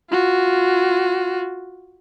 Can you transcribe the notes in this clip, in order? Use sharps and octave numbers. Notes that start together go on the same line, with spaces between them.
F4 F#4